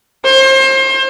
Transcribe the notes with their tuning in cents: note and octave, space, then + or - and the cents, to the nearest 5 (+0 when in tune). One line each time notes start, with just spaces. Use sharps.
C5 +30